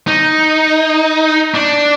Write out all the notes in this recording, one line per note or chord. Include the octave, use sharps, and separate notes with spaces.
D#4
D4